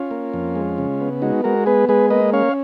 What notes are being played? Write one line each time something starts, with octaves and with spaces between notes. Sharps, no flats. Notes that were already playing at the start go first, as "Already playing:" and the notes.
Already playing: C#4 F4
A#3
F2
G#3
C#3
B3
G#3 D#4 F#4
G#3 F#4 A#4
B3 G#4 B4
G#3 G#4 B4
A#3 B4 D#5
C#4 C#5 F5